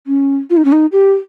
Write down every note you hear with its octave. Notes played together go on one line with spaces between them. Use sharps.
C#4
F4
D#4
C#4
D#4
G4